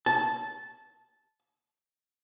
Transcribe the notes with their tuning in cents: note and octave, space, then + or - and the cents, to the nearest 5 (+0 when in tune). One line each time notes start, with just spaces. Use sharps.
A5 -10